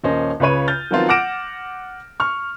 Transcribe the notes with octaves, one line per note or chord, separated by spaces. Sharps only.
D#1 A#3 C#4 C5 D#5
C#2 C#3 B4 C#5 D#7
F6 G6 A6
D#3 F3 F#3 B3 C4 F4
F#5 D6 F6 A#6 D7 E7
C#6 F6